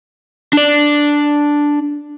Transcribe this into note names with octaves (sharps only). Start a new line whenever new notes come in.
D4 D5